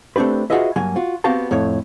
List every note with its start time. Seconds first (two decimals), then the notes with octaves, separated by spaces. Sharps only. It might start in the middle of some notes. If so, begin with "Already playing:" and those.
0.16 A3 C4 D4 G4 B4
0.50 F4 F#4 G#4 B4 D#5 E5
0.76 G2 F#3 A#3 G#5
0.96 F4 F#4
1.24 B3 C4 F#4 G4 F5 A5
1.51 F2 A2 A3 C#5